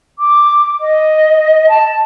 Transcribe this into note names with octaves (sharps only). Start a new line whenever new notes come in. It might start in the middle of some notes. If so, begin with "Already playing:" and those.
D6
D#5
A5